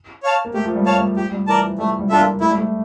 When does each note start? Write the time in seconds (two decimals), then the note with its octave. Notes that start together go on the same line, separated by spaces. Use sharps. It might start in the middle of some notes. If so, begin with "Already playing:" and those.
0.23 C#5 F5 A5
0.45 A#3
0.54 A3 G4
0.65 F3
0.75 G3
0.86 C#5 F5 A5
0.96 G3
1.16 F3 G4
1.32 G3
1.47 E3 A#4 D5 A5
1.63 F3
1.79 G3 A3
1.99 G3
2.09 D4 F4 A4 E5
2.19 A#3
2.41 A3 E4
2.49 G3
2.58 A3